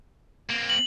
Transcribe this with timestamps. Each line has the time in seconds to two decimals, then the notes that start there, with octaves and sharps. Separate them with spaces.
0.50 A#3 C4
0.70 F#7